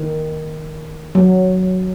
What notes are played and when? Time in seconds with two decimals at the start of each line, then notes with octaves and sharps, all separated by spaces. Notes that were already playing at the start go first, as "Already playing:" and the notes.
Already playing: D#3
1.15 F#3